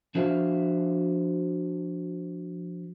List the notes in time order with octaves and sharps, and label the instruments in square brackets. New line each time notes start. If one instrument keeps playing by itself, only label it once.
[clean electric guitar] F3 D4 F#4 C5 E5 F5